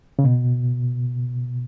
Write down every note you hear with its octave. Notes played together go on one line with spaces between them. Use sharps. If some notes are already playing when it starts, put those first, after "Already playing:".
C#3
B2